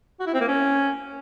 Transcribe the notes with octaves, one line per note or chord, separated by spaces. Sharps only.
F#4
E4
C4
A#3
C#4